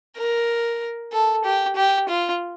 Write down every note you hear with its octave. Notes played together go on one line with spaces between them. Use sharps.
A#4
A4
G4
G4
F4